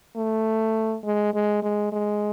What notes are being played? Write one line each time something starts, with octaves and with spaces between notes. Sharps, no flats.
A3
G#3
G#3
G#3
G#3